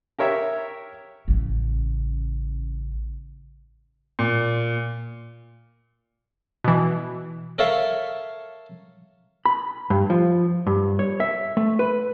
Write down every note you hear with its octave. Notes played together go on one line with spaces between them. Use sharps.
G4 A#4 C#5 E5
A1 C#3
A#2
B2 E3
A4 A#4 C#5 E5 F5 A5
B5
G2
F3
G2
C#5
E5
A3
B4